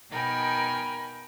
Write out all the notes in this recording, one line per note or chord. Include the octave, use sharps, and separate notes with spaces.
B2 D#4 A#4 G5 G#5 B5